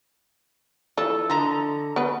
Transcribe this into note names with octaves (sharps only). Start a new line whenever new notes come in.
E3 F3 A4
D3 D#5 A#5
B3 B4